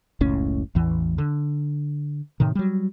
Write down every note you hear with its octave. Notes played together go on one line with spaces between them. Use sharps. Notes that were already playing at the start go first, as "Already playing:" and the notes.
F#1 C#2 A2 C#4
A1 E2 E3
D3
A2 C3 D#3
F#3 G3